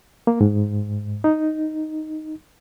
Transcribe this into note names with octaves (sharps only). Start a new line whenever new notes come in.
A#3
G#2
D#4